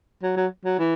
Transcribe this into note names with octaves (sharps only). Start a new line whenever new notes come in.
F#3
F#3
F#3
E3